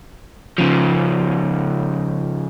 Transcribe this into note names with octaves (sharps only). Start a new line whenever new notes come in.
C#3 F3